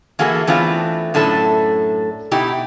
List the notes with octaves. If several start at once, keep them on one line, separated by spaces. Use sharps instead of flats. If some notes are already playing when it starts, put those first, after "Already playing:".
E3 A#3 E4 F#4 G#4 A4
E3 A3 B3 C4 D4 F4
F#2 A2 D4 A4 E5
B2 D#4 E4 G4